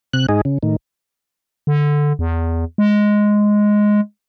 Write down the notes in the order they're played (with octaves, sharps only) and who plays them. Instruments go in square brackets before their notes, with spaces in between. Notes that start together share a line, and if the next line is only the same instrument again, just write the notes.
[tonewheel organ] C3 F#6
G#2 D#4 G#4
C#3
A2 D#3
[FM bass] D3
E2
G#3